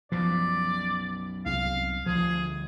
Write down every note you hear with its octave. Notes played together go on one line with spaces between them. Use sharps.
B1 F#2 B2 F3 D5
C2 F5
D2 D3 F3 G3 G#4